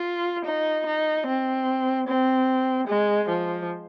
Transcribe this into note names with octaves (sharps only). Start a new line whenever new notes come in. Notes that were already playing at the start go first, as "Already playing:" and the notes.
Already playing: F4
D#4
D#4
C4
C4
G#3
F3